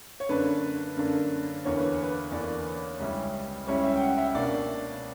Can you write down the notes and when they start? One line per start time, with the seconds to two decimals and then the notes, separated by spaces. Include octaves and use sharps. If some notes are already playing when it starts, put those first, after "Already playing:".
0.20 C#5
0.29 F#2 D3 A#3 D4 B4
0.97 F#2 D3 A#3 D4
1.64 E2 D3 A#3 C#5
1.77 B4
2.03 B4
2.32 E2 D3 A#3 D5
3.00 C#2 C#3 G3 C#4 E4
3.67 C#2 C#3 G3 C#4 E4 C#5
3.84 E5
3.96 G5
4.01 F#5
4.18 E5
4.35 B2 A#3 D4 D5